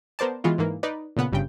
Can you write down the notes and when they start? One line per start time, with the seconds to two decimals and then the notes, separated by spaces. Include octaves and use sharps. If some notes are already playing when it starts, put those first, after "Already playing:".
0.19 B3 A#4 C5 D5 A5
0.44 E3 G#3 B3 F4 F#4
0.58 G#2 E3 A#3
0.83 D#4 B4 D5
1.17 A#2 C#3 B3 F#5
1.32 G1 G2 C#3 G5